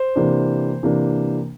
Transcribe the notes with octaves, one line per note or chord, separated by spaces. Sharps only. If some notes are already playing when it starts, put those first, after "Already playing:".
Already playing: C5
C3 E3 A#3 D4
C3 E3 A#3 D4